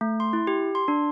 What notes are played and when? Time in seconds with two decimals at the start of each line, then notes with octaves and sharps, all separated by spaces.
0.01 A3
0.20 C6
0.33 E4
0.47 G4
0.75 C6
0.88 D4